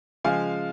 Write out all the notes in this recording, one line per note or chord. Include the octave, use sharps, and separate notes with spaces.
C#3 F3 G#3 F5 G#5